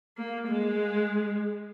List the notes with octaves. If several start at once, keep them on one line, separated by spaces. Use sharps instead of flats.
A#3
G#3